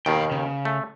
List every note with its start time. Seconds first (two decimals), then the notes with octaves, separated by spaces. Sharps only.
0.06 D#2 B2 D#3 F5 G5
0.31 C#3
0.65 A3